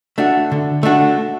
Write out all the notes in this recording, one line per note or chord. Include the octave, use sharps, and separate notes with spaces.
A3 D4 F#4
D3
A3 D4 F#4